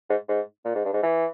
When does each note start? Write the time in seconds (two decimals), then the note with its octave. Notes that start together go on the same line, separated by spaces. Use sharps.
0.09 G#2
0.28 G#2
0.65 A#2
0.75 G#2
0.85 G2
0.93 G#2
1.03 E3